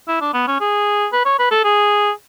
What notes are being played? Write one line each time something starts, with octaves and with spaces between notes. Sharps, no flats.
E4
D4
B3
C#4
G#4
B4
C#5
B4
A4
G#4